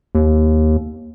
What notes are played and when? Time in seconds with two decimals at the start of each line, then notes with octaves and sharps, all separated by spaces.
0.15 D#2